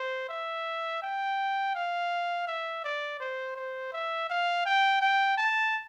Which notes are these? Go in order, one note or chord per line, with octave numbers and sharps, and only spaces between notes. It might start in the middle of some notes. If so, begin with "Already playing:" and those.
Already playing: C5
E5
G5
F5
E5
D5
C5
C5
E5
F5
G5
G5
A5